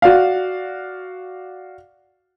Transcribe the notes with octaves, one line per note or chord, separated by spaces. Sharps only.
F#4 D5 F5